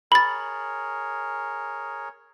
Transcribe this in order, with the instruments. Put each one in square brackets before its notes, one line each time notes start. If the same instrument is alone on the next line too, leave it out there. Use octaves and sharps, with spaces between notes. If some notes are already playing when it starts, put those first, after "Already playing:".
[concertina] G#4 A#4 C#5 [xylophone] B5 A6